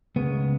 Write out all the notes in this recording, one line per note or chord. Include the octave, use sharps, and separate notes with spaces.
C#2 C#3 G#3 B3